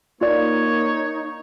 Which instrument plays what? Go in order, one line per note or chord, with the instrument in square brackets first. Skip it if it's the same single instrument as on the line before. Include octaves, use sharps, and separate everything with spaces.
[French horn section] A#3 [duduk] D#4 [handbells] F4 D5 [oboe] C#5